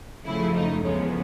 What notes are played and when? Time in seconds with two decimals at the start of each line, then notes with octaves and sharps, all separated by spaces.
0.25 F#2 C#3 F3 A3 E4
0.55 D#4
0.84 E2 C#3 F3 G#3 B3 C#4